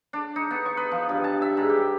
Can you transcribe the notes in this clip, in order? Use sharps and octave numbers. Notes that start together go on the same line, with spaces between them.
D4
D#4
B3
C#6
B4
F3
G2
A5
E5
G#2
G4